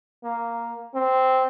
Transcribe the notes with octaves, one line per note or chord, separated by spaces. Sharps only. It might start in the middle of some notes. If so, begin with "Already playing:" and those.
A#3
C4